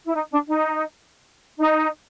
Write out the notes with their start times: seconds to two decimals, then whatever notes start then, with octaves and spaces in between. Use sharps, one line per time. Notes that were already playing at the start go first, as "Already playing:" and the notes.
0.04 E4
0.14 D#4
0.31 D4
0.48 D#4
1.59 D#4